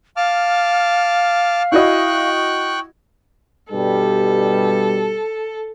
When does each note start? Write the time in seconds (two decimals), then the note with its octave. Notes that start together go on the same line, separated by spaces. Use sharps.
0.17 F5 A5 D6 F6
1.72 E4 F#4 D#5 G5 C#6 F#6
3.72 G2 B2 G3 A4